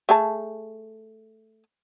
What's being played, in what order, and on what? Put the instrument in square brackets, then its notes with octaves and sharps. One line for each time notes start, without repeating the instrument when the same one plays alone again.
[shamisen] A3 G#4 A5